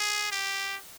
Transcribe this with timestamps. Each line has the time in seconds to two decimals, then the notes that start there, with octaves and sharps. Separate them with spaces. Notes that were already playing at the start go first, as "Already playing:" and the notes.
Already playing: G#4
0.32 G4